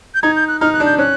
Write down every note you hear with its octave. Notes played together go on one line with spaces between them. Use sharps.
G6
D#4 G#6
G6
F#6
D#4 F6
F#6
D4
G6
C#4 F#6